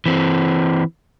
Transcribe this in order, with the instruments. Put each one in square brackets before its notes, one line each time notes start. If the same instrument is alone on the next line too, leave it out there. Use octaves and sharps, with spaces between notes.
[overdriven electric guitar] E3 C4